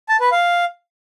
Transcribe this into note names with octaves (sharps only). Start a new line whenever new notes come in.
A5
B4
F5